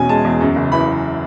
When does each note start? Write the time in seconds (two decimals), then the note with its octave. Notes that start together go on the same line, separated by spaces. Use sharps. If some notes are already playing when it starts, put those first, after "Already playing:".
Already playing: E2 B2 C#4 G#5
0.09 G#3 A5
0.25 E2
0.41 F#2
0.56 F#1
0.72 E3 B5
0.87 F#1